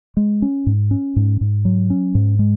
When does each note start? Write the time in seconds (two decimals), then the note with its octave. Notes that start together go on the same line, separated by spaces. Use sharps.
0.17 G#3
0.42 C#4
0.66 G#2
0.91 C#4
1.16 G#2
1.41 G#2
1.65 F#3
1.90 C#4
2.15 G#2
2.39 G#3